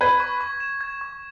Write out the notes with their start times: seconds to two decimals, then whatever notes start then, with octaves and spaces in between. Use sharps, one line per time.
0.01 B4 G#6
0.20 C#6
0.41 C#6
0.60 E7
0.81 G#6
1.01 C#6